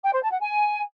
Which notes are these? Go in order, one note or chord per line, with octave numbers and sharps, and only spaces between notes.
G5
C5
A5
F#5
G#5